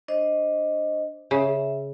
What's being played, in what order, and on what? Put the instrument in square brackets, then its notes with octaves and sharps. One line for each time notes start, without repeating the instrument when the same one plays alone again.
[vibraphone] D4 C5 D#5
[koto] C#3 [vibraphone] E5